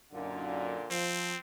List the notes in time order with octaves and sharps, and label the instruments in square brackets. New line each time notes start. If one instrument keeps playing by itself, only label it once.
[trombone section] F#2 D#4 [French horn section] A#2 D3
[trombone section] F3 [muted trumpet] C4